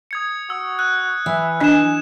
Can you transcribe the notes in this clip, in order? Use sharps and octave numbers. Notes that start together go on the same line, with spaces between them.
D#6 G#6 C#7
F#4 E6
E6 F#6
E3 E5
D4 D#5 G#5 F#6 E7